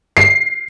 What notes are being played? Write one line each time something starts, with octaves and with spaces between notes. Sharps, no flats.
C7